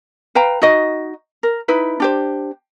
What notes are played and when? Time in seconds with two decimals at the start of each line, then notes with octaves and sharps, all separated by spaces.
0.35 B4 F5 G5 A#5
0.62 D#4 F#4 D#5
1.43 A#4
1.68 D#4 E4 B4
2.00 D4 G4 C5